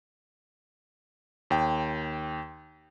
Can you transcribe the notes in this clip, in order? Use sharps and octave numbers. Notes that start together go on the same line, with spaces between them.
D#2 G5